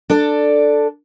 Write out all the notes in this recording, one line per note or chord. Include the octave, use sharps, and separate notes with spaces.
D4 A4 D5